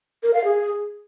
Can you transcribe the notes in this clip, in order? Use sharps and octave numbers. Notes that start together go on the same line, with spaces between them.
A#4
F5
G#4